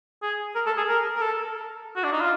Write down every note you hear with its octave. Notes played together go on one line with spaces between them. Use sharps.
G#4
A#4
A4
G#4
A#4
A#4
A4
F#4
D4
D#4
F4